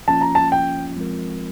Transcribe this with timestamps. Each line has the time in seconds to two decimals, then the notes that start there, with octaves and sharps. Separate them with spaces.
0.08 F3 A#3 C#4 F4 A5
0.21 A#5
0.35 A5
0.52 G5
0.96 F3 G#3 C4 F4 A#4